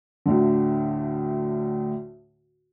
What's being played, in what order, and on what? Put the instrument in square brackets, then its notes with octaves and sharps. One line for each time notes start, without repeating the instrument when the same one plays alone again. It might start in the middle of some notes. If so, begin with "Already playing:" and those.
[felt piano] D2 A2 D3